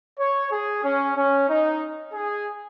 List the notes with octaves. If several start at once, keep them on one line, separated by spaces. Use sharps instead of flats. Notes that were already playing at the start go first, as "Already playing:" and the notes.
C#5
G#4
C#4
C#4
D#4
G#4